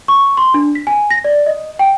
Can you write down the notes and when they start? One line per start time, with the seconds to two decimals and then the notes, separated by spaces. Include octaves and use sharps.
0.08 C#6
0.37 C6
0.54 D4
0.75 B6
0.87 G#5
1.10 A#6
1.24 D5
1.46 D#5
1.79 G5